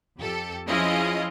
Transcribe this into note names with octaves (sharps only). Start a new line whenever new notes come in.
F2 G4 A4
F3 C#4 E4 F4 G#4 D#5